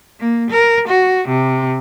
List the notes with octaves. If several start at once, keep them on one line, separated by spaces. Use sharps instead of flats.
A#3
A#4
F#4
C3